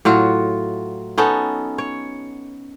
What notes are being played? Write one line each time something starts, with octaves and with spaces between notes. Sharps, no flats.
A2 F#3 F4 F#4
B3 C#4 D#4 A4
C#5